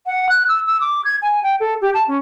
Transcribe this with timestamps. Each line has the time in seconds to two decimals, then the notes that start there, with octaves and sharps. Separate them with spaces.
0.06 F#5
0.29 F#6
0.48 E6
0.66 E6
0.80 D6
1.04 G#6
1.22 G#5
1.43 G5
1.60 A4
1.81 G4
1.94 A5
2.07 C#4